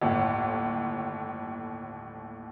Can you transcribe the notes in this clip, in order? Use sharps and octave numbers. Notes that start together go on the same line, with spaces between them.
G1 D#2 A2